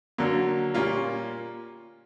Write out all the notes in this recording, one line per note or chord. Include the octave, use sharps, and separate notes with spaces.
D3 F#3 A#3
A#2 G3 A#3 C#4 F4